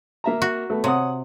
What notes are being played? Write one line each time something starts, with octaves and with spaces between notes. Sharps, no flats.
A#3 E5 A#5
F#4
A3 B3
C3 C#5 F#5 D#6